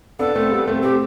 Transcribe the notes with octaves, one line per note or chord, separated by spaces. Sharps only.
B3 D4 A4
A3 C4
G3 B3
A3 C4
A3 C4 G4